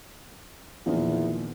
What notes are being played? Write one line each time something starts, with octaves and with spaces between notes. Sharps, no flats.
E2 A#2 D#3 F3